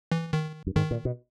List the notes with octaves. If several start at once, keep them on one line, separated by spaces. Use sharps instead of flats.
E3
D#3
F#2
G#2 D#3
A#2
B2